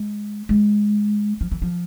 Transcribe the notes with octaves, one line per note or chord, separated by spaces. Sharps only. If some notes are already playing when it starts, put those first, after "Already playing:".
Already playing: G#3
G#3
F3
E3
F3